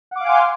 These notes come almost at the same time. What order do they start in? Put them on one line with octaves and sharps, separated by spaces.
F#5 D6 F5 G#5 C6